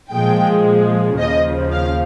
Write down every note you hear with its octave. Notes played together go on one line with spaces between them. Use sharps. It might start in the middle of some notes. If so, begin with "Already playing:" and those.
A#2 F3 G#3 G5
D#2 C#3 F3 D#5
F5